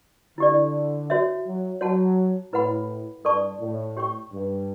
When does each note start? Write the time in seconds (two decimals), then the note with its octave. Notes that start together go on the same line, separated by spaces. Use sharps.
0.38 D3 E4 G4 D5
1.10 F#4 C#5 E5
1.46 F#3
1.81 F#3 F#4 C#5 F#5 A5
2.53 A2 E4 B4 F#5 B5
3.24 G2 A4 D5 A5 C#6
3.60 A2
3.97 G4 C#5 G5 C#6
4.32 G2